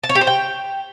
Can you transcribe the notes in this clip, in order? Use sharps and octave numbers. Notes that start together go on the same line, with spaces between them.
A5
C#5
G4
C5
G5